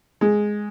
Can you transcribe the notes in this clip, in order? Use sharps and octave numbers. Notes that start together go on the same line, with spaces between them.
G#3